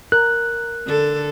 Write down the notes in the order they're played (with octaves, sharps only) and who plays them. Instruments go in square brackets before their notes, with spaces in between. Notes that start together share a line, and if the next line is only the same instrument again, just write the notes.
[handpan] A#4 [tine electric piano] F#6
[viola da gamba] D3 A4